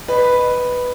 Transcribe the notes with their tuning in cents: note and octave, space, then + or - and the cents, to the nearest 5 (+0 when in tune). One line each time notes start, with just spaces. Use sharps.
B4 +0 D#5 -20